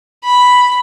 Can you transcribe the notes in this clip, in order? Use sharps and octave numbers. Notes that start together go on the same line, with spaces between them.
B5